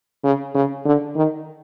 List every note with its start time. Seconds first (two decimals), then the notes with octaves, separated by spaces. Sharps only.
0.24 C#3
0.55 C#3
0.85 D3
1.16 D#3